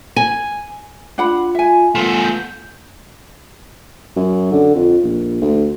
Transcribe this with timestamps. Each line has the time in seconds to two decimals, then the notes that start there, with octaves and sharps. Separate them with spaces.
0.16 G#5
1.18 D4 F4 F#5 B5
1.55 E5 G#5
1.95 A3 B3 F4 G#5
2.24 G6
4.16 F#2
4.52 D3
4.75 F2
5.04 A#1
5.41 D2